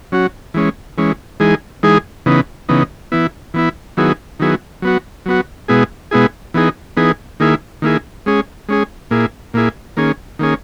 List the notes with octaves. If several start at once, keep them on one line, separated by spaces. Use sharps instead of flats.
F#3 C#4 F#4
E3 G#3 C#4
E3 G#3 C#4
E3 G#3 D#4 G#4
E3 G#3 D#4 G#4
C#3 E3 B3 D#4
C#3 E3 B3 D#4
E3 B3 E4
E3 B3 E4
D#3 F#3 B3 E4 G#4
D#3 F#3 B3 E4 G#4
F#3 B3 F#4
F#3 B3 F#4
B2 G#3 B3 E4 G#4
B2 G#3 B3 E4 G#4
E3 B3 D#4 G#4
E3 B3 D#4 G#4
D#3 A#3 E4 G#4
D#3 A#3 E4 G#4
G#3 C#4 G#4
G#3 C#4 G#4
A#2 A#3 E4 G#4
A#2 A#3 E4 G#4
D#3 A#3 C#4 G#4
D#3 A#3 C#4 G#4